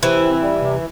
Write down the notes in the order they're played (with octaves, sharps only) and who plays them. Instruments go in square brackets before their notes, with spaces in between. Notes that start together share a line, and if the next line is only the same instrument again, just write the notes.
[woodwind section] C3 [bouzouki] E3 E4
[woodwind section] C4
G3
C3